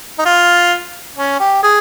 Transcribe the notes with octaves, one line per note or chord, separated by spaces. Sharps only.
D#4
F4
C#4
G4
G#4